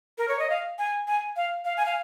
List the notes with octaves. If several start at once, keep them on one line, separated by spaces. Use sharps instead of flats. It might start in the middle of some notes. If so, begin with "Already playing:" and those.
A#4
C#5
D#5
F5
G#5
G#5
F5
F5
G#5
F5